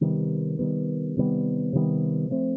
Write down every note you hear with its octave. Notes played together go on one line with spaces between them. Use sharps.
C3 D#3 G3 B3
C3 D#3 G3 B3
C3 D#3 G3 B3
C3 D#3 G3 B3
F3 A3 C4